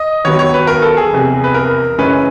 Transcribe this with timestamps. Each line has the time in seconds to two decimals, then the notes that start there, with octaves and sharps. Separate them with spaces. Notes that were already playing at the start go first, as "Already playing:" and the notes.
Already playing: D#5
0.25 D#2 D#3 F#3 B3 C#5
0.39 C#5
0.54 B4
0.67 A#4
0.82 A4
0.97 G#4
1.12 F1 E2 C3
1.44 B4
1.54 A#4
1.98 F#2 C#3 E3 G#3 C#4 B4